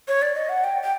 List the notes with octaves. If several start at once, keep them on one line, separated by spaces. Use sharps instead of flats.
C#5
D5
D#5
F#5
G5
G5